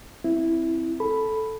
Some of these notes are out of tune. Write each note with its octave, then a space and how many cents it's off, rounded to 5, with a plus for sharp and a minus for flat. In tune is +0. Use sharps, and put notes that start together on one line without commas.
C4 +5 E4 +0
A4 -5 B5 +0